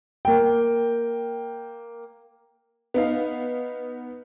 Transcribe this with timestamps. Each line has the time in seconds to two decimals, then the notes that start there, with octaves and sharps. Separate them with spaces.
0.25 A#3 G5
2.94 B3 D#4 F5